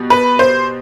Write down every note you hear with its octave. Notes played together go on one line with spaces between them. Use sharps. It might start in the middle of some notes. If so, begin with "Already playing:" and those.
Already playing: B2 G3
B4
C5